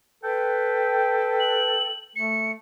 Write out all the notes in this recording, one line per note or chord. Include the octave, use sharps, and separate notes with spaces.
A4 B4 G5
F#7
A3 C#7